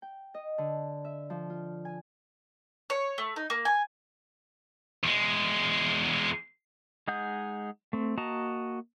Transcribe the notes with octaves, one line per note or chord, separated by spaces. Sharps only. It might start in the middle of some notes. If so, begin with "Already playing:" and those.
G5
D#5
D3
E5
F3
F4
G#5
C#5
A3
D#4
A#3
G#5
E2 G#3
G#3 D#4 G#4 F#5 G6
A3 C4
A#3 F#4 D#5 A5 A#5